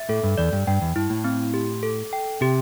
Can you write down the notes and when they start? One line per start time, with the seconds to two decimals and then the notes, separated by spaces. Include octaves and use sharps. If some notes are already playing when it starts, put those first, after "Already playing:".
Already playing: E5
0.09 A2 A4
0.23 G2
0.38 E2 D5
0.52 G2
0.67 G2 G5
0.82 E2
0.96 G2 E4
1.10 A2
1.24 C4
1.54 G4
1.83 A4
2.13 G5
2.41 C3 G4